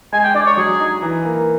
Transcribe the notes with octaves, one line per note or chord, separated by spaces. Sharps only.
G#3 G#5
G5
D4 D5
C#5
F#3 G#4
D#4
E3
A#3